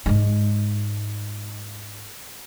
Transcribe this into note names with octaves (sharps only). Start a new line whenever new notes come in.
G#2 G#3